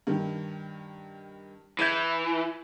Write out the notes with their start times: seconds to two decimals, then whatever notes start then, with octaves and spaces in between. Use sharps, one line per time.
0.07 G2 D#3
1.79 E3 G6 G#6 D#7